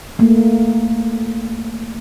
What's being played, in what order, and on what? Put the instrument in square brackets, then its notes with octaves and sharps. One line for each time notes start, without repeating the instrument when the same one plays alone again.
[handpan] A3 A#3